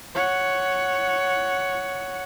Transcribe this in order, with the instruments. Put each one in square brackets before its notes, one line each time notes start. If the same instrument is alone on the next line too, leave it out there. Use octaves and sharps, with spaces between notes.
[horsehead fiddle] C#5 F#5